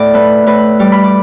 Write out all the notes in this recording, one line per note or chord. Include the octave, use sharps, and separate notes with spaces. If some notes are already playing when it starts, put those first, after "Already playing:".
Already playing: A2 D5
A3 B4
A2 B4
G3 D6
B5
D6